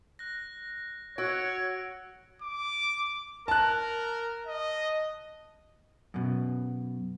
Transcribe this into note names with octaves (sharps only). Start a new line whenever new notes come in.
F#6 A#6
F#4 C#5 E6 D7
D6
A#4 A5 F#6
D#5
F#2 B2